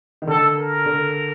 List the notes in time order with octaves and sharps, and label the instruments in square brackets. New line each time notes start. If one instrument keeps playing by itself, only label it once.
[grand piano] D#3
[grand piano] D3 [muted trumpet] A4
[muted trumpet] A#4
[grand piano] D3